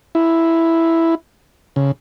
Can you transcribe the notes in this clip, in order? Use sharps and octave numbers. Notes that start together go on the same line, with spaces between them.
E4
C#3